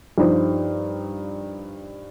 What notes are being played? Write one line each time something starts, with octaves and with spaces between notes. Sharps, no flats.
G2 F3 D#4 C5